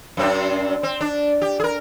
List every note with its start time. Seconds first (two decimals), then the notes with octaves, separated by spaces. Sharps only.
0.17 F#2 C4 D4
0.83 C4
1.01 D4
1.42 G4
1.60 G#4 A#4